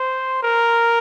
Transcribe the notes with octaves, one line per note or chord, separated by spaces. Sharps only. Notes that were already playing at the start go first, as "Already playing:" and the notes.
Already playing: C5
A#4